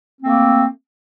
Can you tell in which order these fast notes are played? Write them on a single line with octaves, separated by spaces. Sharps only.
C4 A#3 A3